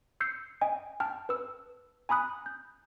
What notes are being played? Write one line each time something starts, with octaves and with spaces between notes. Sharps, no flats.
E6 G6 C7 C#7
D#5 G5 G#5
G5 A5 F6
B4 E6
G#5 A#5 B5 D#6 F#6
G6